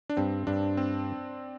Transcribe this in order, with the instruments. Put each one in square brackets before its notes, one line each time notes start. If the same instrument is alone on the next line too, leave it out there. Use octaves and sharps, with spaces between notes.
[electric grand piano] D4
[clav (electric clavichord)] G2 [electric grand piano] C4
[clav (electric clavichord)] G2 [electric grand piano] D4
[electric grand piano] C4